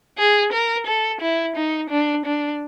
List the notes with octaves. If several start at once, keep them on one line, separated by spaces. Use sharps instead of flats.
G#4
A#4
A4
E4
D#4
D4
D4